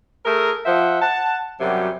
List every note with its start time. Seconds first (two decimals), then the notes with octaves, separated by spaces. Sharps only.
0.24 A3 G#4 A#4
0.64 F3 C5 E5 F#5
1.00 F#5 A5
1.59 F#2 C3 F#3 G3